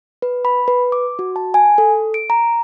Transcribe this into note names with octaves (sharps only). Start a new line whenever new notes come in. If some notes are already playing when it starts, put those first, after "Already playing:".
B4
B5
B4
D6
F#4
A5
G#5
A4
D7
A#5